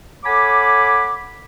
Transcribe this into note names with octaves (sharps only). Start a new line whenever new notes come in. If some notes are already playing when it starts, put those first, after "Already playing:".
A4 C#5 F#5 G#5 B5 D6